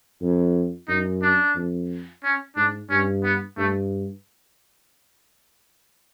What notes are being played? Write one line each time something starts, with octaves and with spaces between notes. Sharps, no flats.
F2
F#2 D#4
D4
F2
C#4
G#2 D4
G2 C#4
B3
G2 A3